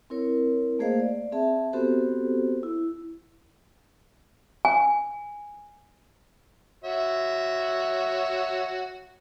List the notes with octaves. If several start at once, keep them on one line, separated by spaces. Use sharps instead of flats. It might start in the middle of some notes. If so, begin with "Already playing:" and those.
C4 E4 A#4 C#5
A3 A#3 G#4 C5 D#5 F5
D5
C4 G#4 E5 A5
B3 C4 F#4 G4 A4 C5
E4
G#5
F#4 C#5 E5